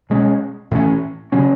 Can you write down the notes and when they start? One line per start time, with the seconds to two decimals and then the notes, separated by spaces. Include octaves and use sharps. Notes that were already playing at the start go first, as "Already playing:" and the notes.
0.10 B2 G#3 C#4
0.71 A2 E3 A3 C#4
1.32 C#3 F#3 C#4